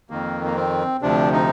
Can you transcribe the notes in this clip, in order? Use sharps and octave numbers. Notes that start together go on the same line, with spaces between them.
F2 D#3 A#3
A#3
C4
D2 C3 F3 D4
D#4